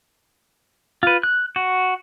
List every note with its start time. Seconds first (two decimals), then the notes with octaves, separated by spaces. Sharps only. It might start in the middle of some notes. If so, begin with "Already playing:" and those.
1.03 F4 B4
1.23 F#6
1.56 F#4